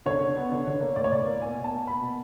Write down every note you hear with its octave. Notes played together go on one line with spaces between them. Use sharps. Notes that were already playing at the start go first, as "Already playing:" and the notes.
D3 C#5
D3
B3
D3
D3
A#3
A2 D5
C#5
A2 D5
A#3
B2 G#5
B2
A5
A#3
B2 B5
B2